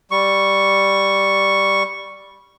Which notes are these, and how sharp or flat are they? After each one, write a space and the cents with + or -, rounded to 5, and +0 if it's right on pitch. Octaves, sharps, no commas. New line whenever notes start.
G3 +0 C#6 +0